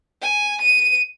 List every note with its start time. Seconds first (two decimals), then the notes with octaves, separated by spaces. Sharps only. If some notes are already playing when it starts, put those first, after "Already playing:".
0.22 G#5
0.61 D#7